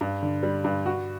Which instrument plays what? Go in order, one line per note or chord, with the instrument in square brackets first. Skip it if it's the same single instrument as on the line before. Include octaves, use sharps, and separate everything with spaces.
[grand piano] G2
D3
G3
G2
F#4